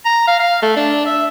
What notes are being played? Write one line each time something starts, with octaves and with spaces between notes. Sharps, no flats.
A#5
F5
F5
A3
D4
E5